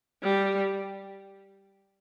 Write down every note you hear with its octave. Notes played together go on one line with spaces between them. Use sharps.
G3